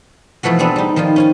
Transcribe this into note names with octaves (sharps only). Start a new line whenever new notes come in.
B2 E3 F3 A3 F#4
B3 C4 D4 G#4 A4
G3 D#4
D#3 F3 G3 F4
C#4 F4 G#5